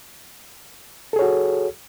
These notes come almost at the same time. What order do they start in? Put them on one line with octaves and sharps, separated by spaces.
A4 G#4 C#5 F#4